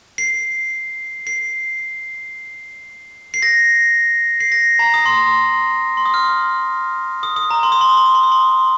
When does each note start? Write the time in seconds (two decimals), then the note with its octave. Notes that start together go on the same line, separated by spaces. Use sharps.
0.18 C7
1.27 C7
3.34 C7
3.42 A#6
4.40 C7
4.52 A#6
4.79 A#5
4.94 D#6
5.06 C6
5.97 C6
6.05 D#6
6.14 F6
7.23 D#6
7.36 D#6
7.51 A#5
7.63 C6
7.72 D#6
7.81 C6
7.89 D#6
7.97 C6
8.06 D#6
8.15 C6
8.23 D#6
8.32 C6